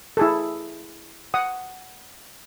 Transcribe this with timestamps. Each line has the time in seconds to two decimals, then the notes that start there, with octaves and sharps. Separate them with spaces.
0.17 E4 G#4 A4
1.34 F#5 D#6